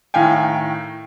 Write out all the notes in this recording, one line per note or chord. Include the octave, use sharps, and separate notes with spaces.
A2 D#3 F5 G5 G#5